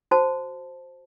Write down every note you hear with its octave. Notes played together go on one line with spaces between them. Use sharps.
F#4 C5 A5